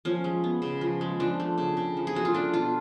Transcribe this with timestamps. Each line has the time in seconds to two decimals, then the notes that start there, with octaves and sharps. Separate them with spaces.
0.05 F3 C#4
0.24 G#3
0.44 B3
0.62 C#3
0.81 F3
1.01 G#3
1.20 F3 D4
1.40 A3
1.58 C#3
1.77 C#3
1.97 F3
2.07 G#4
2.15 A3 F#4
2.25 F4
2.34 A3 D4
2.53 B2 F4